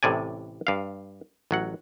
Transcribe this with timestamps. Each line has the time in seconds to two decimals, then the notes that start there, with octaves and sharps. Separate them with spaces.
0.03 A1 A2 C3 D5 G#5
0.67 G2 F5
1.51 A1 F#3 F#5